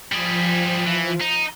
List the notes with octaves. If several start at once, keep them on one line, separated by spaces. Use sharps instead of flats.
F3 G3 G#4
E3
D#4